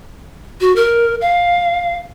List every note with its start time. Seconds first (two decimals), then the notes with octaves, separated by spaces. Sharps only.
0.61 F#4
0.76 A#4
1.21 F5